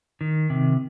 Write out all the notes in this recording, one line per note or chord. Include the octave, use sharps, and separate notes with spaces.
D#3
C3